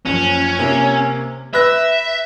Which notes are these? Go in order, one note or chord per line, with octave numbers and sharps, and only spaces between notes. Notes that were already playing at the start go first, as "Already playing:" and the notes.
F#1 F3 C#4
C3 A#3
B4 E5 F#6 A#6